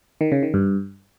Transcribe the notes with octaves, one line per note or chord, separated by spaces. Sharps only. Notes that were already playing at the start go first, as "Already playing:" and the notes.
D#3
C#3
D#3
G2